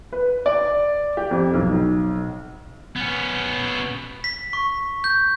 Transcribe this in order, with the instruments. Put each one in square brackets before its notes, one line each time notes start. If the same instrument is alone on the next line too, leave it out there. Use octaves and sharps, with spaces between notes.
[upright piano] B4
D5
G4
F2
B1
[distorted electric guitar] B3 C#4
[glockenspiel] B6
C#6
G6